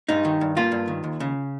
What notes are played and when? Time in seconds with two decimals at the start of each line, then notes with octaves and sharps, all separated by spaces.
0.08 G2 D#4
0.25 D#3
0.41 G2
0.57 A#3 F4
0.72 G2
0.88 D#3
1.04 D#2
1.20 C#3